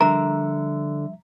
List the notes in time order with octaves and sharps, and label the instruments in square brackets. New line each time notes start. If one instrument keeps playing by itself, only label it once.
[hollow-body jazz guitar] D3 A#4 [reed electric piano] F3 G3 E5 [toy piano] A#5